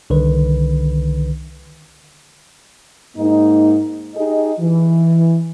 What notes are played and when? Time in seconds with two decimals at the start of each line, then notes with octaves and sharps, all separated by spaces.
0.10 C2 D3 D#3 B4
3.17 G#2 A#3 D#4
4.15 D#4 G4 G#4 D#5
4.59 E3